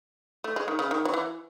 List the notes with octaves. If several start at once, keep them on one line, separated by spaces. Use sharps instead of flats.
A3
G#3
D#3
C#3
D#3
F#3
E3